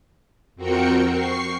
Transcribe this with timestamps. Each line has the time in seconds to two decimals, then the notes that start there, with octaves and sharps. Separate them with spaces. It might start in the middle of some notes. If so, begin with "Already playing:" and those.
0.56 F2 C4 F#4 A#4 G5 C#7
1.08 C#6 C7